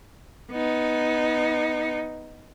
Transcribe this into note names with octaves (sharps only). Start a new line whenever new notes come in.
B3 D#4